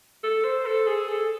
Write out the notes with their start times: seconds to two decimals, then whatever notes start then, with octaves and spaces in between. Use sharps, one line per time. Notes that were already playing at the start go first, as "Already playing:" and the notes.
0.24 A4
0.44 C5
0.66 A4
0.87 G#4
1.08 A4